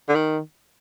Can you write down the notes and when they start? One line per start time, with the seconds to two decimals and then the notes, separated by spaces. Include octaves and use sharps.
0.09 D3
0.15 D#3